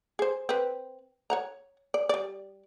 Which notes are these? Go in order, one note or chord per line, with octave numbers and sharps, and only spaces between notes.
G#4 C5
C4 B4
C#5 F#5 A#5
D5
G3 D5